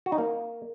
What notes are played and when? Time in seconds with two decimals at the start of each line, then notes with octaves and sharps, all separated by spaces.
0.06 F#4
0.12 D#4
0.18 A#3